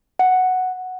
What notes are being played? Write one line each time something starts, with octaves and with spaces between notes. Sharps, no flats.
F#5